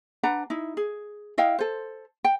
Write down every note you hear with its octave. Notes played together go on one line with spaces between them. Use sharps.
D4 B4 F#5 A#5
D#4 E4
G#4
E4 D#5 F5 G5
A4 C5
G5